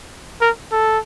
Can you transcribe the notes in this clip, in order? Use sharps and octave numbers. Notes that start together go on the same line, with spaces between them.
A#4
A4